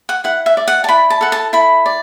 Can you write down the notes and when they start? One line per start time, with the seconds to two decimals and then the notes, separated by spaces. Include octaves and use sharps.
0.09 F#5
0.24 E4 F#5
0.46 E5
0.57 D5
0.68 F#5
0.84 A5
0.89 E4 B5
1.10 A5
1.21 A4 F#5
1.32 A5
1.53 E4 B5
1.86 D5